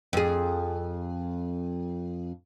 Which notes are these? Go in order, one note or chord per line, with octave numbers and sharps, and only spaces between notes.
F2 G#4